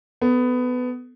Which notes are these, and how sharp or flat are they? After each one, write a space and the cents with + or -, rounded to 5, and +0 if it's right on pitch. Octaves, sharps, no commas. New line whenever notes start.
B3 +15 A4 +0